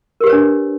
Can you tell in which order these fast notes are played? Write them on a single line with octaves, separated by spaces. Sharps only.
A#4 G4 B4 C#5 D4